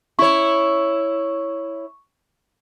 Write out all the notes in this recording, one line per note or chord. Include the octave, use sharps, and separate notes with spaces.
E4 C#5 C#6